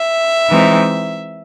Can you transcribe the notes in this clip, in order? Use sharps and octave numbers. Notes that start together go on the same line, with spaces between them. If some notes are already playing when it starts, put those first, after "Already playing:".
Already playing: E5
E3 G#3 C4 D#4